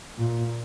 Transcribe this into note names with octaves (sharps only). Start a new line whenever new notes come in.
A#2